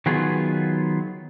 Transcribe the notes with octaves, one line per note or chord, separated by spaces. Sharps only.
D#3 F#3 B3 F4 G#4